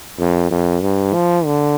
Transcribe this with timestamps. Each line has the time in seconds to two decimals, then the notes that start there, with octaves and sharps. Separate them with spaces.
0.20 F2
0.51 F2
0.82 G2
1.14 F3
1.45 D3